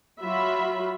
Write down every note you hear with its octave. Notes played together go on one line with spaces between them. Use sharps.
F#3 F4 F#4 E5 B5